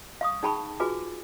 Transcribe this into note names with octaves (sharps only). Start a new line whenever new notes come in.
F5 C#6 D#6
D#4 G#4 G5 A5 B5 C#6
F4 F#4 G#4 B4 G#5 D6